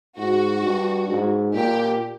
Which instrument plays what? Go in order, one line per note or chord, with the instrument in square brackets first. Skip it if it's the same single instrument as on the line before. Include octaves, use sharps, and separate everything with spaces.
[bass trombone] G#2 [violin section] F#4
[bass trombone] G2
G#2
[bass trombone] A#2 [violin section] G4